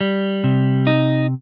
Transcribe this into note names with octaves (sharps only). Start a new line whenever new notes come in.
G3
C3
D#4